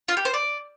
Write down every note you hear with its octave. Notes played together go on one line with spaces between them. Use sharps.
F4
G4
C5
D5